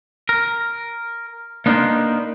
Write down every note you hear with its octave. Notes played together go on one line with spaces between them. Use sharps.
A#4
A#3 B3 D4 D#4 A#4 C5